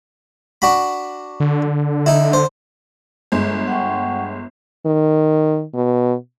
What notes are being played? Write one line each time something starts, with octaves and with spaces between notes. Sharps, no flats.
D4 F#4 B5
D3
D#4 E4
C5
G1 G#3
F#5 G5 C#6
D#3
B2